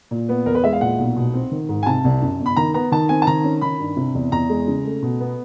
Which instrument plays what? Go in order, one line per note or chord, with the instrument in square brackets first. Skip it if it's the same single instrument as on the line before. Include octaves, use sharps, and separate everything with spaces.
[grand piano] A#2
B3
E2 A#4
B4
G#3 E5
F5
A#2 F#5
B1
B2
C4
D#3
G#2
G#5
C3 A5
C2
F#2
G1
B5
D#3 A#5
B3 A#5
D#3 A5
C4 G#5
A5
D#3 A#5
C#4
D#3 B5
G2
C3
E2
E2 A#5
G#3
C#3
A3
B2
B3